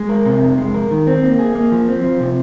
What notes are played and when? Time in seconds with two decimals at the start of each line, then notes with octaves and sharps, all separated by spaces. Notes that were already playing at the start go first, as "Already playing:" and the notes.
Already playing: G#3
0.09 A#4
0.26 C3
0.42 F2
0.58 G#3
0.74 A#4
0.91 D#3
1.07 C4
1.23 A#3
1.39 G#4
1.55 A#3
1.72 F3
1.88 C4
2.04 F3
2.20 C3